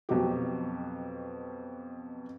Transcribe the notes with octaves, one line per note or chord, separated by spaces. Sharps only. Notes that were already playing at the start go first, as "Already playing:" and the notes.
F2 B2 F#3 F#4 G4